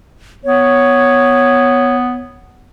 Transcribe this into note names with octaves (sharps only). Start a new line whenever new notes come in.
B3 C#5